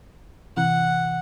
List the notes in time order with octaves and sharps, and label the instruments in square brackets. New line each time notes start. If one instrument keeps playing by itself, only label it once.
[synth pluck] C3 E3 F#6 [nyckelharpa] F#5